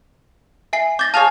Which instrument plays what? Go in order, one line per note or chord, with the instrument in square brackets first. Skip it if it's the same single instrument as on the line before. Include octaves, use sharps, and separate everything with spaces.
[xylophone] E5 G#5 C7
[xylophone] D6 A6 A#6 [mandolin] G6
[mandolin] F4 G#4 C#5 [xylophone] A5 F7